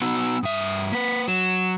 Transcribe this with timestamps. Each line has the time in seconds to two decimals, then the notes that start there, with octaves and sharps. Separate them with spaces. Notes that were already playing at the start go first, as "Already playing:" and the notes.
0.02 B3 D#4 F#4 E6
0.43 G2 E5 D#6
0.92 A#3 B4 B6
1.28 F#3 E7